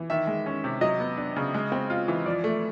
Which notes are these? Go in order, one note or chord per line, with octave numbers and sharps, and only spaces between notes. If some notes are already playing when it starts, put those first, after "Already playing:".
Already playing: E3
D#3 E5
G#3
C#4
C3
F#3 D#5
B3
D4
C#3
G#3
C4
F4
E3
F3 D5
A3